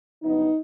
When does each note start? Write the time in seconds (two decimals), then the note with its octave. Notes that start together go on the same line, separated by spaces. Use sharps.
0.23 G2 D3 F#3 B3 D#4